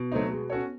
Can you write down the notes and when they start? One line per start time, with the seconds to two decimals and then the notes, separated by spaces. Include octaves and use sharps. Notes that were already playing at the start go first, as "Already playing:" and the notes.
Already playing: B2
0.12 F#3 A3 C4 D#4
0.32 G#3
0.50 C#4 F#4 A4 C#5